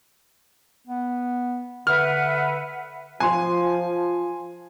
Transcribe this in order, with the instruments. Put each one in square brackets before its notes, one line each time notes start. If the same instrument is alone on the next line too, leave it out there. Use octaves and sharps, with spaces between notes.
[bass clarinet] B3
[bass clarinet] D3 [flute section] B4 E5 F#5 [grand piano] F6
[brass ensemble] F3 [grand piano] G#5 C6